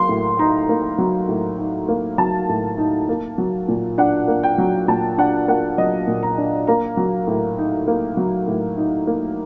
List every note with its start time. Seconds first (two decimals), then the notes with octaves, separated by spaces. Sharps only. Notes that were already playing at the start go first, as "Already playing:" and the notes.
Already playing: F#3 A#3 C6
0.09 A2
0.39 D#4 A#5
0.69 A#3
0.98 F#3
1.29 A2
1.59 D#4
1.88 A#3
2.18 F#3 A5
2.49 A2
2.78 D#4
3.09 A#3
3.38 F#3
3.68 A#2
3.98 D4 F#5
4.28 A#3
4.43 G5
4.58 F#3
4.88 A#2 A5
5.18 D4 F#5
5.48 A#3 F#5
5.78 F#3 D#5
6.07 A#2
6.23 A#5
6.38 D4
6.67 A#3 A#5
6.97 F#3
7.28 A2
7.58 D#4
7.88 A#3
8.17 F#3
8.48 A2
8.78 D#4
9.07 A#3